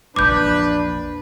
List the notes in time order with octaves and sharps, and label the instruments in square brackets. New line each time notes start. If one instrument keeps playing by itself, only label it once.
[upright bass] A#1 E2 [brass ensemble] D4 B4 [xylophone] D6 G6